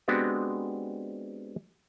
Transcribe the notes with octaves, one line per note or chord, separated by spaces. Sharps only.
G#3 B3 C4 D4 F#4 G4